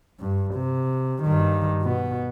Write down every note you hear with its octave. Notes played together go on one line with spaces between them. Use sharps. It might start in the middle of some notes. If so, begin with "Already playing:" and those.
G2
C3
G2 D#3
B2 B3